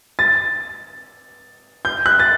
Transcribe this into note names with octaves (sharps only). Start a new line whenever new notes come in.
A6
G6
F#6
A6